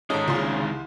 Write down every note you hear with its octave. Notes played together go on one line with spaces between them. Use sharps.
G#2 D#3 G#3 C#4 D#4 A4 A#5
C2 A#2 C#3 C6